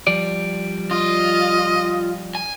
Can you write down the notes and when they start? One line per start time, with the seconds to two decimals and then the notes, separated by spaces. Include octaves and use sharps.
0.07 F3 G3 D5
0.91 F4 D#5
2.35 G#5